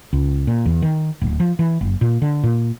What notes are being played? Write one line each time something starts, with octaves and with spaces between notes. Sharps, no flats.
C#2
A#2
E2
D#3
D1
F3
E3
F#1
A#2
D3
A#2